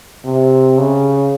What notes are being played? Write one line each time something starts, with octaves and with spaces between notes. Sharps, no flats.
C3
C#3